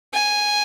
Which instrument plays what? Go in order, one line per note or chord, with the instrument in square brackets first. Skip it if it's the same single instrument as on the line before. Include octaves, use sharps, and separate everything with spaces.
[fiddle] G#5